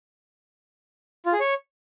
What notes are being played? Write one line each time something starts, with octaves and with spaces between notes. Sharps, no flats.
F4
G#4
C#5